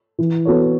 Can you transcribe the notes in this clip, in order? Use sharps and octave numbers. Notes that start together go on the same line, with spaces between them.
E3
B3 F#4 A4 C#5